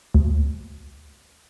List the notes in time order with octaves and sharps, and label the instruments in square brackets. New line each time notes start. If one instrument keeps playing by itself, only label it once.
[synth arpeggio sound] D2